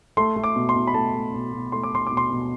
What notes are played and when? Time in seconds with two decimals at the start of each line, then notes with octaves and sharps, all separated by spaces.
0.17 A3 C6
0.36 A3
0.44 D6
0.56 B2
0.69 C6
0.76 B2
0.87 B5
0.94 A3 A5
1.14 A3
1.34 B2
1.53 B2
1.72 A3 C6
1.83 D6
1.92 A3 C6
2.07 B2 D6
2.17 C6
2.31 B2